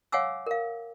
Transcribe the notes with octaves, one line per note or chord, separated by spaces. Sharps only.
C#5 F5 F#5 G#5 D6 E6
A#4 F5